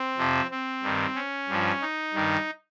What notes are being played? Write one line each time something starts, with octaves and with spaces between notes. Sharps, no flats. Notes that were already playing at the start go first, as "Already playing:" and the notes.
Already playing: C4
F2 C3 F3
C4
G2 D#3
C#4
G2 F3
D#4
G2 D#3